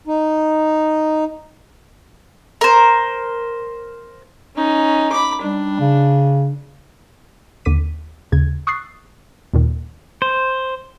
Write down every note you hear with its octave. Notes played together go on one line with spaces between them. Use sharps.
D#4
A#4 C5
C#4 D#4
B5 D6
G3 D4
C#3
D#2 D3 D6 B6 D#7
D#2 C#3 G#6
C#6 D#6 E6 F#6 A6 C7
D#2 A#2 D#3
C5